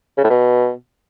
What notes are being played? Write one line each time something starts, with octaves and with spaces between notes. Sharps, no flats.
C#3
A2
B2